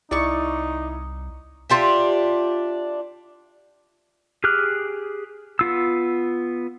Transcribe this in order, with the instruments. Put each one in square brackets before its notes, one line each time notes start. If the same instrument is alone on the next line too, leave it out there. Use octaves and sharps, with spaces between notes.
[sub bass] C2 [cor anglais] D#4 [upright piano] E4 [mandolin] D5 C#6
[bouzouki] D4 F4 G4 E5
[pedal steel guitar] G4 G#4 D6 F6 F#6
B3 F4 E6